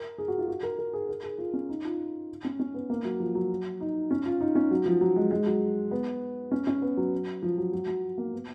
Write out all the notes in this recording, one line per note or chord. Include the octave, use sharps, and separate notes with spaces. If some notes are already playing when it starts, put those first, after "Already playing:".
Already playing: A#4
G#4
F#4
F4
F#4
A#4
A#4
G#4
A#4
G#4
F4
C#4
D#4
F4
C#4
C#4
B3
A#3
F#3
F3
F#3
D#4
C#4
F4
D#4
C#4
F#3
F3
F#3
G#3
G#3
F#3
B3
C#4
C#4
B3
F#3
F3
F#3
F#3
F#3
A#3
B3